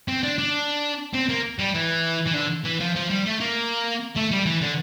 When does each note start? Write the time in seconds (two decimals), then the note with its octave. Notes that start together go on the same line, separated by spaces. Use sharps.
0.08 C4
0.23 D4
0.38 D4
1.14 C4
1.29 A#3
1.59 G3
1.75 E3
2.27 E3
2.34 D3
2.65 E3
2.80 F3
2.95 F3
3.10 G3
3.26 A3
3.41 A#3
4.16 A3
4.31 G3
4.46 E3
4.61 D3